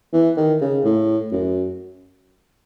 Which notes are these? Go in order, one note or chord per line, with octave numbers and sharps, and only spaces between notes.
E3
D#3
C#3
A2
F#2